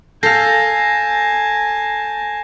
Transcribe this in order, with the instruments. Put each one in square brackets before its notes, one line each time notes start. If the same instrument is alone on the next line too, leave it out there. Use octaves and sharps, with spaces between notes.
[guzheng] A4 F5 [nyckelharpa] G#5 A5 [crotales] G6 A#6 C7